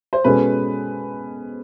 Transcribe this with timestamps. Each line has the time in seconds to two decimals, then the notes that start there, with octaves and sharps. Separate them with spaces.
0.13 C5
0.24 B2 G#3 C#4 F#4 A4 B4